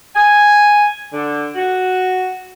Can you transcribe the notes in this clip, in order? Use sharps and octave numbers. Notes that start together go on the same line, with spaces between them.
G#5
D3
F#4